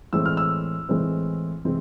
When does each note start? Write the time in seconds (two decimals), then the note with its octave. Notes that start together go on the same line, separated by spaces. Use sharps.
0.13 A2 E3 G#3 C4 E6
0.25 F6
0.37 E6
0.89 A2 E3 G#3 C4
1.65 C3 E3 G#3 C4